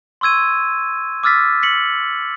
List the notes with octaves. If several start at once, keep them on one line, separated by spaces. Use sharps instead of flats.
C6 C#6 E6 G#6 D#7
D6 E6 F6 A6 B6
B6 C#7 F#7